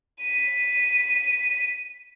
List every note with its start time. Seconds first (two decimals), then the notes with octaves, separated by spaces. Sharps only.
0.20 B6 D#7